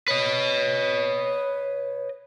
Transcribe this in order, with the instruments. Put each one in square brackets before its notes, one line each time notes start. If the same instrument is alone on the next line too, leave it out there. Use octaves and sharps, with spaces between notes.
[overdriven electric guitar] B4 D#5 [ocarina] C#5